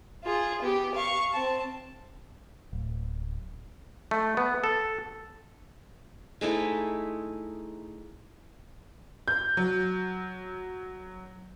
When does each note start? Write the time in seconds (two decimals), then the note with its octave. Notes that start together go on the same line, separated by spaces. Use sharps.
0.24 F4 G#4
0.62 B3 G4
0.95 F5 C#6
1.33 C4 A5
2.73 D1
4.11 A3
4.37 B3
4.64 A4
6.41 G#3 A3 D#4 E4
9.28 G6
9.57 F#3